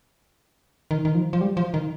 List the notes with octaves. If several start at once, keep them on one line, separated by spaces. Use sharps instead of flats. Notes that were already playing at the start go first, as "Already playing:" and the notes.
D#3
D#3
F3
F3
G3
F3
D#3